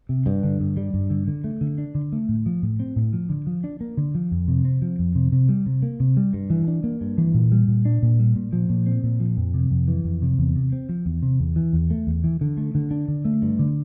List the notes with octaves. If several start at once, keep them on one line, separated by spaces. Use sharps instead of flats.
C3
G2
D3
G2
G3
G2
D3
D3
A3
D3
D4
D3
A3
A2
F3
A2
C4
A2
F3
D3
F3
D4
A#3
D3
F3
F2
C3
C4
F3
F2
C3
C3
G3
C3
A#3
C3
G3
G2
E3
D4
A#3
G2
E3
A#2
G3
A#2
D4
A#2
G3
A#2
F3
A#2
C4
A#2
F3
F2
C3
F2
E3
F2
C3
E2
C3
C4
F3
E2
C3
E2
E3
E2
A3
E2
E3
D3
A3
D3
D4
D3
A3
G2
D3